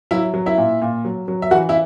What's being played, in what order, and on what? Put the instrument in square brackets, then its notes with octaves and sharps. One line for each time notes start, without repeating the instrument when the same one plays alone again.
[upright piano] F#3 E4 E5
F#3
E4 E5
A#2
A#2
F#3
F#3
E5
E3 F#4 F#5
E4 E5